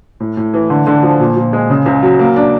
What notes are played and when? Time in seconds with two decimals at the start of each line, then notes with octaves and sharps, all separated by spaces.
0.20 A2
0.37 A2
0.54 E3
0.70 D3
0.87 D3
1.03 F3
1.20 A#2
1.36 A#2
1.53 G#3
1.70 C#3
1.86 C#2
2.03 F#3
2.19 A#3
2.36 D4